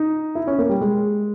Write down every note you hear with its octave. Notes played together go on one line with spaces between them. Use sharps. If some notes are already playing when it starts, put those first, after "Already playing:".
Already playing: D#4
E4
C#4
A#3
G3
G#3